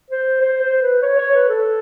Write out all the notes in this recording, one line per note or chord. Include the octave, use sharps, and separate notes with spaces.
C5
C5
C5
B4
C#5
C#5
B4
A4